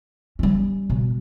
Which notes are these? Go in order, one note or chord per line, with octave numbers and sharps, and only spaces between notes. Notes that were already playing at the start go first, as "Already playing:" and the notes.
G3 C#4
B2